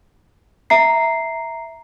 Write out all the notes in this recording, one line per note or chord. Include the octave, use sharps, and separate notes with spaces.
E5 A#5 C7